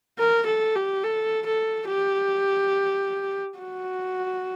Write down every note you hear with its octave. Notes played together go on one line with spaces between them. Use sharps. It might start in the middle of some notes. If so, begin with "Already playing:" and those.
A#4
A4
G4
A4
A4
G4
F#4